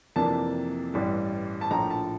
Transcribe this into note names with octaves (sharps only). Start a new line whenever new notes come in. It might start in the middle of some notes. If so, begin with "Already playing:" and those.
F2 C3 E3 A#3 D4 A5
A1 G2 E3 G3 D4
A5
A#1 A2 F3 A#5
A5